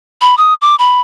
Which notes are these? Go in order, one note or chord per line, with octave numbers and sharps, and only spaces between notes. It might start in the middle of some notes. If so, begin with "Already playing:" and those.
B5
D#6
D6
B5